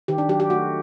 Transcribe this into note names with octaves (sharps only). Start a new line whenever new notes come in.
D#3 G4
D4
F#3 G4
G4
A3 F#4